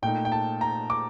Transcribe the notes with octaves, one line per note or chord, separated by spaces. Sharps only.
A#2 A3 D#4 G5
G5
A5
A#5
D6